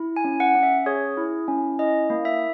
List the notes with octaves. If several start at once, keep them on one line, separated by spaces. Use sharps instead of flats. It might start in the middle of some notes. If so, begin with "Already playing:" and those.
Already playing: E4
G#5
C#4
F#5
C#4
E5
G#4 C#5
E4
C#4
E4 D#5
A#3
E5